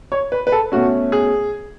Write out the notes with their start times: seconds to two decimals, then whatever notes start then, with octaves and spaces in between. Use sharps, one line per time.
0.12 C#5
0.32 B4
0.47 B4
0.52 A4
0.72 B2 A3 C#4 F#4
1.12 G#4